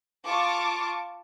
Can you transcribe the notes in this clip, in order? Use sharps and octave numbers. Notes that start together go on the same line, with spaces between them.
F4 A5 C#6 D6